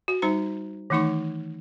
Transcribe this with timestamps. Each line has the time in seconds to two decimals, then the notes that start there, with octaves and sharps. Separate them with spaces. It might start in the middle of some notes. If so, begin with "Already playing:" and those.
0.08 F#4
0.22 G3 D#4 C5 A#5
0.90 D#3 E3 A3 D#4 C#5 C#6